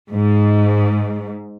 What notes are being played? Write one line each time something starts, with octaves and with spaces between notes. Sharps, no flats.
G#2